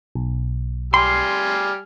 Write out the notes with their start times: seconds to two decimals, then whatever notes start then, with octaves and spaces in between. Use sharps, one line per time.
0.15 B1
0.94 G3 G#5 C6 F6